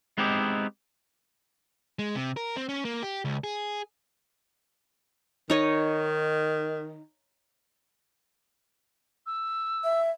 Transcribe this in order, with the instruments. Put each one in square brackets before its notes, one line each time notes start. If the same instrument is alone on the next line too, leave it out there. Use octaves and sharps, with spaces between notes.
[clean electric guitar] G#3 B3 C4 D#4 E4 G4
[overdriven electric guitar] G#3
C3
A#4
C4
C#4
A#3
G4
C#2
G#4
[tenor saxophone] D#3 [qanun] D#4 C#5 D#5
[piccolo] E6
[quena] E5